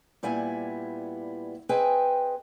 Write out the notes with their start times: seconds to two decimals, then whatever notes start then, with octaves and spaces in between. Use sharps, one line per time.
0.23 A#2 G3 B3 E4 G#5
1.69 C4 G#4 B4 D#5 G5 G#5